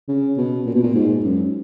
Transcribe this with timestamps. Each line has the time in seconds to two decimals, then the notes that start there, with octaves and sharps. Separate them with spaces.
0.08 C#3
0.38 B2
0.66 A#2
0.74 B2
0.83 A#2
0.95 G#2
1.24 F#2